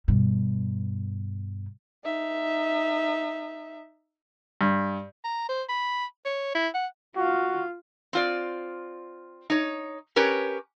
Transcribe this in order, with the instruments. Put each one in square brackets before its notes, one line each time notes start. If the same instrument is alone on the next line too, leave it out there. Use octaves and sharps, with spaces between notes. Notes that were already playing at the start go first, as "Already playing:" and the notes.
[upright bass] G2 B2
[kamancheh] D#4 E5
[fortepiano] G2
[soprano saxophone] A#5
C5
B5
C#5
E4
F#5
[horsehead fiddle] F4 F5 [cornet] F#4
[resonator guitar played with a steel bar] C4 F4 D5
D#4 C#5
C#4 G4 A#4 B4 C#5